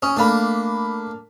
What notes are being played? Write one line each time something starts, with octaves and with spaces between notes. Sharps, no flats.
C#4 D#6
A3 A#3 D4 B5